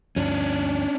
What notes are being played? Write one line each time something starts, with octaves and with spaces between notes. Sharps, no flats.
D2 G2 F3 C#4 D4